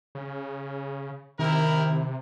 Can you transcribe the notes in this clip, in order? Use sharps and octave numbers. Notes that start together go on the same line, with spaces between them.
C#3
C3 D#3 E4 G4 A#4